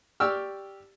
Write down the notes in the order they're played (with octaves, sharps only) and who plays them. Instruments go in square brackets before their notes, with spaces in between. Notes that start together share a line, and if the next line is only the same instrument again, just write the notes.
[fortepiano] G4 D5 G5 C#6 E6 F6